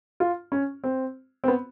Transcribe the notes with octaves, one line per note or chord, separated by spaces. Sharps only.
F4
C#4
C4
C4
B3